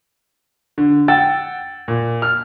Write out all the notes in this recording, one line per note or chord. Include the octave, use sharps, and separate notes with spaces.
D3
F#5 G5 E6 A6
A#2
F6